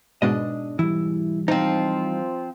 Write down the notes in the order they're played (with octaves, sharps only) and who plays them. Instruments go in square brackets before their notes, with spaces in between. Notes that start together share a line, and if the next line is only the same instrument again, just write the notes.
[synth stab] G#2 B2 G#3 [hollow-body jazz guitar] D4 D#5
[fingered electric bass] E3 G3 [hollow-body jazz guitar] E4
[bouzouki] F3 C4 [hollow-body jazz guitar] D#4